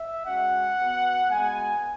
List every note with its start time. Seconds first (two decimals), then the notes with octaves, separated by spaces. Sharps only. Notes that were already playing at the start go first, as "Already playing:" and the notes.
Already playing: E5
0.26 G#3 C#4 F#4 F#5
0.78 B3 F#4
1.30 G#3 B3 F#4 G#5